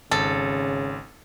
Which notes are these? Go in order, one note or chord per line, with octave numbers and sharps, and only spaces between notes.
G#1 C#3 A4